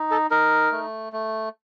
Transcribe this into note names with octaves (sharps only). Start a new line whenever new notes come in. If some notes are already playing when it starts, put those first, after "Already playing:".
Already playing: D#4
A4
D#4 A#4
A3
A3